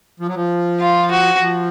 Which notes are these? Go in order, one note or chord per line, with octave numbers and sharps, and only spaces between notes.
F3
F#3
F3
F4
F#4
F3